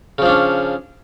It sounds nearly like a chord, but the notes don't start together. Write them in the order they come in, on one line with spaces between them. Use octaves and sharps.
C#3 F3 D4 C#4